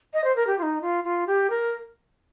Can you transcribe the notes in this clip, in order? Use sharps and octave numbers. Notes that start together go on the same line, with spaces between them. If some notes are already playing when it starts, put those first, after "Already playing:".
D#5
C5
A#4
G4
F4
D#4
F4
F4
G4
A#4